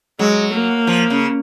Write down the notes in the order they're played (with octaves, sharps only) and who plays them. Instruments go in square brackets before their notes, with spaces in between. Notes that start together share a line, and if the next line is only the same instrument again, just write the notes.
[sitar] F#3 [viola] G#3
[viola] A#3
[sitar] F3
C#3